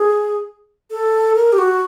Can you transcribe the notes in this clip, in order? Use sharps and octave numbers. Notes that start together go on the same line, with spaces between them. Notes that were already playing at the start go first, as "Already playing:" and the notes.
Already playing: G#4
A4
A#4
G4
F#4